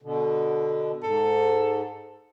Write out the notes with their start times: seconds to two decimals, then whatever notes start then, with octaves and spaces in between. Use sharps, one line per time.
0.02 B2 D3
1.03 G#2 A4